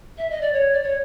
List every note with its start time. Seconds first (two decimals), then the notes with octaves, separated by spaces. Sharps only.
0.17 E5
0.29 D#5
0.41 D5
0.52 C#5
0.72 D5
0.82 C#5